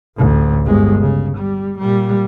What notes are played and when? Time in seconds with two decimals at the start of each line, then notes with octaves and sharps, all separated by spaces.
0.17 A1 D2
0.65 G1 G#3
1.01 C#3
1.38 G3
1.79 A#2 G3